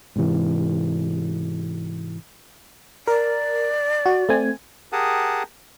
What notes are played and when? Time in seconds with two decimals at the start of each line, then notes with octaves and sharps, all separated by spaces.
0.16 G#2 C3 E3
3.08 A#4 D5
4.06 F#4
4.29 A3 C4 G#5
4.92 G4 G#4 A#4 F#5 A5 D#6